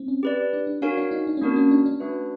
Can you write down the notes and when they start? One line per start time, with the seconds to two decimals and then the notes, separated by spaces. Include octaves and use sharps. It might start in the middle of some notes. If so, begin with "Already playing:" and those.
Already playing: C4
0.08 C#4
0.23 G4 B4 D5
0.53 D4
0.67 D4
0.82 D4 F#4 A#4 C#5 F5 G#5
0.97 D4
1.11 D#4
1.27 D4
1.37 C#4
1.42 A#3 C4 D4 F#4 A#4 C#5
1.56 C#4
1.71 D4
1.86 D4
2.00 A3 D4 F#4 B4 E5